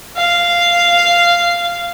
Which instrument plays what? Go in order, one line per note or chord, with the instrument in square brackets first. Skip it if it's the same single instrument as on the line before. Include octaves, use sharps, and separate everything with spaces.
[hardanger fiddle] F5